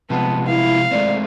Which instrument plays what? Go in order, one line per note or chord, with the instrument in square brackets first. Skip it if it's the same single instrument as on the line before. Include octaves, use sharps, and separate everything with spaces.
[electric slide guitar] C3 F3 G#3 [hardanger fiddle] B3 [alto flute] A5
[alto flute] E4 [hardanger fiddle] F5
[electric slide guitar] G#3 A3 C4 [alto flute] D5